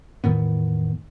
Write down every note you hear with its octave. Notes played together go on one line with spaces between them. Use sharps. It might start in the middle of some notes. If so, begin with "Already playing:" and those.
E2 A2 D#3 B3